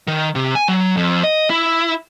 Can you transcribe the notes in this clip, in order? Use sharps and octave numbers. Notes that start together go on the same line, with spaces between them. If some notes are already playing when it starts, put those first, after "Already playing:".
D#3
C3
G#5
F#3
F2
D#5
E4